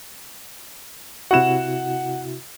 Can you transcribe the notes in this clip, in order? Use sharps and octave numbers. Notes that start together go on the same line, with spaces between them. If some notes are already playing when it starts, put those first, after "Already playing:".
C3 E4 F#4 F#5 E7